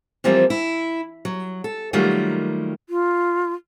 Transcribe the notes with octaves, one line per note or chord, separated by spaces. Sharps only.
E3 F3 G3 A#3 C4 F4
E4
F#3
A4
D#3 F#3 G3 A3 A#3 F4
F4